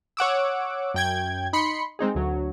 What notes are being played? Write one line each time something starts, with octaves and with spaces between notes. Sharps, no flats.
C#5 F#5 D6 E6
F#2 G5 G#6
D#4 B5 C6 C#7
G#3 C4 D#4 G#4
D2 F#3